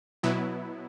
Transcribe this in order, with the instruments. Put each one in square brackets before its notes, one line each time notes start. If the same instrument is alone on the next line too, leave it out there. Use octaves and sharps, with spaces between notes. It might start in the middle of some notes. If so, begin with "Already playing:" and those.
[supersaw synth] B2 F#3 B3 E4